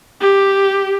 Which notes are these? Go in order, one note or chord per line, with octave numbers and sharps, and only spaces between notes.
G4